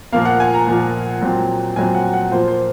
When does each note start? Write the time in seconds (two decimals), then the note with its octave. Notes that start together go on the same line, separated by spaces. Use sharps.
0.13 A#2 F3 A#3 F5
0.25 F#5
0.40 G#5
0.54 A#5
0.67 A#2 F3 A#3
1.21 A#2 F#3 C4
1.76 A#2 F#3 C4 G#5
1.95 F#5
2.14 F#5
2.31 A#2 F3 A#3 C5
2.48 C5